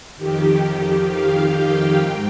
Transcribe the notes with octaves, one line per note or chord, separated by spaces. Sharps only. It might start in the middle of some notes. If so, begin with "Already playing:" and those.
F2 D#3 G4
F5
G5
G#2